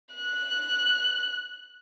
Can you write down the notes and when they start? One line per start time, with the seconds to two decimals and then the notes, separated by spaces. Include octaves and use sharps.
0.15 F#6